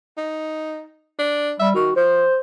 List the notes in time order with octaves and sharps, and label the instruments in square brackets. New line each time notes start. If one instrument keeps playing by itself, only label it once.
[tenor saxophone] D#4
D4
[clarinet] G3 [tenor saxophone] E5
[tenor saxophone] D#3 [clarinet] F#4
[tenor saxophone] F3 [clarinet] C5